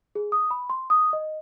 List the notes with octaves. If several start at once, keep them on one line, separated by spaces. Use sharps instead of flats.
G#4
D#6
B5
C6
D#6
D#5